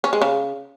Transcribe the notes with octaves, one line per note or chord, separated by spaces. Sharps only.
C#4
G#3
C#3